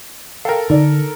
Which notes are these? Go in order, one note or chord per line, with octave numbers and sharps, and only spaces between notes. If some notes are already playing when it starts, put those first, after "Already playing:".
A4 A#4 F5 G5
D3 D#4 D5